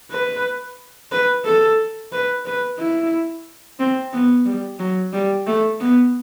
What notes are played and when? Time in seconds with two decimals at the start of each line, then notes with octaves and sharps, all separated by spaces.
0.11 B4
1.12 B4
1.46 A4
2.12 B4
2.46 B4
2.79 E4
3.80 C4
4.13 B3
4.46 G3
4.80 F#3
5.13 G3
5.47 A3
5.80 B3